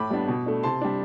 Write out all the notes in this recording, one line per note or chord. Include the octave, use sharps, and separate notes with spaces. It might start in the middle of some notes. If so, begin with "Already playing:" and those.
Already playing: A2 B5 D6
G3 B3 D4
B2
A3 D4
C3 A5 C6
G3 D4